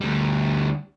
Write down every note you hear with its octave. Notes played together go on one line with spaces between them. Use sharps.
D2 G3